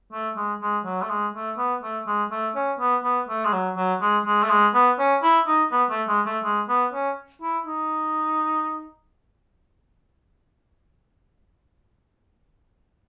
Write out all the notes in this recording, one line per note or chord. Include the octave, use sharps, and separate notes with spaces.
A3
G#3
G#3
F#3
A3
G#3
A3
B3
A3
G#3
A3
C#4
B3
B3
A3
G#3
F#3
F#3
G#3
G#3
A3
G#3
B3
C#4
E4
D#4
B3
A3
G#3
A3
G#3
B3
C#4
E4
D#4